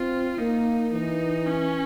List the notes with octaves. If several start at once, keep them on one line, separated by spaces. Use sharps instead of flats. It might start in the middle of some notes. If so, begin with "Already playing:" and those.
Already playing: C4 F4
A#3 D#4
E3 D#4
C#4